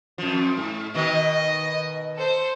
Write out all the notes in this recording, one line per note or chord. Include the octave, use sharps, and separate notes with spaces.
F2 F3
G#2
B2 D#3 D#5
A4 C5